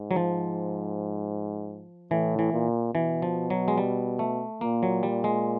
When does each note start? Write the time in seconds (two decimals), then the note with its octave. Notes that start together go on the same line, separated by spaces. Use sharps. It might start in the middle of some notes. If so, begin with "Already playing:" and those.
Already playing: G#2
0.11 F#3
0.16 F3
2.11 A2 E3
2.39 E3
2.53 A#2
2.94 B2 E3
3.22 F3
3.50 F#3
3.68 G#3
3.78 G3
4.19 A3
4.61 A#2 A#3
4.83 F#3
5.03 G3
5.24 G#3